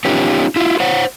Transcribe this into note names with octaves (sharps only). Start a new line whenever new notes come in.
B3 C#4 D#4 F4 G4
E4 F4
C5 C#5 F#5